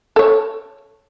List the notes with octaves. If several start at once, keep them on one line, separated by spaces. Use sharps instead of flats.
A4 C#5